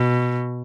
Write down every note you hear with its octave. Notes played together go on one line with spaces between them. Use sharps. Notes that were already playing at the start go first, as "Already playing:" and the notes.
Already playing: B2